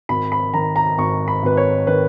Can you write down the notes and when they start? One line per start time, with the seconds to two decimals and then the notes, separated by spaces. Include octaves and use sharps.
0.09 G#1 B5
0.32 B5
0.54 D#3 A#5
0.76 A#5
0.98 G#1 C#6
1.28 B5
1.43 G#1 B4
1.57 C#5
1.87 D#3 B4